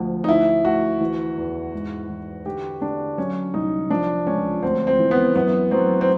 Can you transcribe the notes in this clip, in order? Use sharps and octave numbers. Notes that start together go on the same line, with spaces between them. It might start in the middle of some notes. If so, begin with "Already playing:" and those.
Already playing: D2 F3
D#4
D2 E4
D2 F#4
E3
E2
G#2
E3
D3 G4
D3 D4
F#3 C#4
C2 D#4
F3 D4
C#2 C#4
D2 C4
C4
E3
B3
F#2 B3
F#3 C4
C4